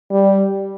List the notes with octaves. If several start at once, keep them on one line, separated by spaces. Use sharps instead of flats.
G3